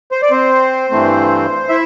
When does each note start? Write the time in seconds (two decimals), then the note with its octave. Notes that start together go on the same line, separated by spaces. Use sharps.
0.12 C5
0.22 D5
0.31 C4 C5
0.90 G2 E3 A3 C4
1.69 E4 E5